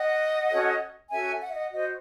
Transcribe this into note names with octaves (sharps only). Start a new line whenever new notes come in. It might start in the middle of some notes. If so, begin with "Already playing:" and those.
Already playing: D#5 F#5
C#4 F#4 A4 C#5
C#4 F#4 A4 C#5 E5 G#5
F#5
E5
D#5 F#5
F#4 C5 D#5